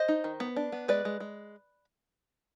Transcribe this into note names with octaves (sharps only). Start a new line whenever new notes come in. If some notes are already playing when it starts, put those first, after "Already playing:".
Already playing: C5 D#5
D#4
D#3
B3
D4
B3
G#3 B4 D5
G#3
G#3